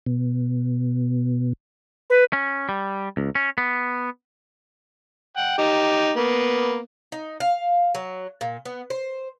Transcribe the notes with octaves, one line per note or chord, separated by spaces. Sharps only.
B2
B4
C#4
G3
C#2
C#4
B3
F#5 G5
D#4 G4
A#3 B3
D#4
F5
F#3
A#2
B3
C5